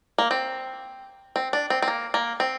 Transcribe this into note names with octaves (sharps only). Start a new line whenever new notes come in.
A#3
C4
C4
D4
C4
C4
A#3
A#3
C4